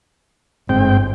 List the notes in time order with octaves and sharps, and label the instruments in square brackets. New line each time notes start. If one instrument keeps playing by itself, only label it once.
[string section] G1 [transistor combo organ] G#2 C4 G5